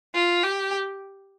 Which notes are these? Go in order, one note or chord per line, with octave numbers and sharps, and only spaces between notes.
F4
G4